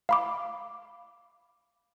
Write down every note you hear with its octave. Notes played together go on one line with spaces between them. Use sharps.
F5 B5 D6